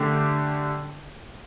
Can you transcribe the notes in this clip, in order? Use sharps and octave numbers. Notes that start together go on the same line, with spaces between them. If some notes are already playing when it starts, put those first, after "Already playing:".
Already playing: D3 A3 D4 G4